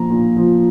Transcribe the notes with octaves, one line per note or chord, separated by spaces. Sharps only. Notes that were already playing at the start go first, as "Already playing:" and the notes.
Already playing: A#2 F3 A#5
A#2
F3